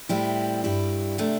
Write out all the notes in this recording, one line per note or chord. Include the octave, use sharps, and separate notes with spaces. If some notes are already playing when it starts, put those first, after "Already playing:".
A2 G3 C4 E4
G2 G3 E4
C3 A3 D4